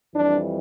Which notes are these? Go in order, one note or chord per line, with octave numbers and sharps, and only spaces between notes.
F2 E3 G3 D4